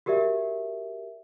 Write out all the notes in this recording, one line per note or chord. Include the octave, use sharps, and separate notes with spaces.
F#4 G4 A#4 D5 E5